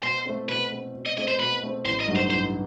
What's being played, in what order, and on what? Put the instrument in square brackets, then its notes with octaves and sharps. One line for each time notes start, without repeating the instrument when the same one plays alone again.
[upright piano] B2 [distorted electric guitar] C5
[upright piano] A3 C4
[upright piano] B2 [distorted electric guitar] B4
[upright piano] A3 C4
B2
[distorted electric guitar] D#5
[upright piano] A3 C4 [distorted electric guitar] D#5
[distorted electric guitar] C5
[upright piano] B2 [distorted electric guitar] B4
[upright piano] A3 C4
[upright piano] A1 [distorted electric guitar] C5
[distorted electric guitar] D#5
[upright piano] G2 F#3 A3 D#4
[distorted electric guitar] C5
[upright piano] A1 [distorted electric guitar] C5